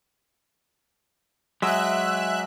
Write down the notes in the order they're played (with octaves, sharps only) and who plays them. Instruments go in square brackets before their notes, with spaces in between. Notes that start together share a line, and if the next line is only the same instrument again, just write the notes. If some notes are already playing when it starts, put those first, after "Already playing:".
[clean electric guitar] F#3 G#3 [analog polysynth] E5 F#6